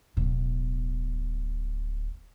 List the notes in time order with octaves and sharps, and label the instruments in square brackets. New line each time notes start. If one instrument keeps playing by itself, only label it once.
[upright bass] D1 B2